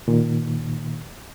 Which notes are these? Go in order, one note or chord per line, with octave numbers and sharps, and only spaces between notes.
A#2 D#3